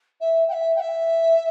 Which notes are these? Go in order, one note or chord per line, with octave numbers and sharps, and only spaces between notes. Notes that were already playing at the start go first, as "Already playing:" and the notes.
E5
G5
E5
G5
E5